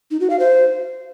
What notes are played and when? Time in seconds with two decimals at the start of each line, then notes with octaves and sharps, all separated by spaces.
0.11 D#4
0.20 F#4
0.30 F5
0.39 C5